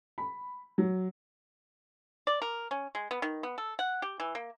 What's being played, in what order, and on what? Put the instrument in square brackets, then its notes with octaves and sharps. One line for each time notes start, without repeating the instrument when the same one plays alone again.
[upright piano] B5
F#3
[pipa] D5
A#4
C#4
G#3
B3
D#3
B3
A4
F#5
G4
E3
A#3